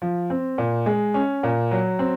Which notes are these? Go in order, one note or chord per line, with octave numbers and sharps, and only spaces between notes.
F3
C4
A#2
G#3
C#4
A#2
F#3
C4